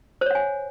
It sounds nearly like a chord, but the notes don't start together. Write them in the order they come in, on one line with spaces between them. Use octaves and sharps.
C5 C#5 F#5 G#5